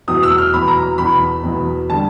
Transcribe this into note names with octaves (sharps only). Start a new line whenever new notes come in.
E2 B2 F#3 D#6
E6
F6
E2 B2 F#3 B5
A#5
E2 B2 F#3 B5
E2 B2 F#3
D3 G3 A5